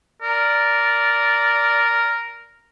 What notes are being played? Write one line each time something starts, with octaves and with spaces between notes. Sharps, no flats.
A#4 D5